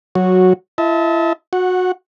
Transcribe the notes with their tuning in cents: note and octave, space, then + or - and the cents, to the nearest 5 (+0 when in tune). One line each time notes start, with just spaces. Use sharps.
F#3 +0 F#4 -10
E4 +40 E5 -45 A5 +0
F#4 -20 F#5 +0